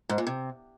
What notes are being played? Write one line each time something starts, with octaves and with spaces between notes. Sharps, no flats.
G#2
A#2
C3